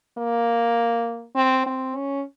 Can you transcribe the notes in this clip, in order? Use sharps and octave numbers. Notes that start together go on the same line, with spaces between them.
A#3
C4
C4
C#4